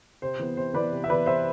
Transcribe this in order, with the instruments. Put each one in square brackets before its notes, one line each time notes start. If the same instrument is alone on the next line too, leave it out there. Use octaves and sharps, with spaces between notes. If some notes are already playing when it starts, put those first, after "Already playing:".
[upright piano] C3 C5
E3 B3
C3 C5
E3 B3 B4 D5
C3
E5
E3 B3 B4 D5
C3 C5 E5